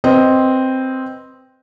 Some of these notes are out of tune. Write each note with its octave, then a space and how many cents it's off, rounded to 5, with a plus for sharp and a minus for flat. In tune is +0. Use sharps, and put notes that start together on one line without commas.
C4 +0 B4 +0 D#5 +0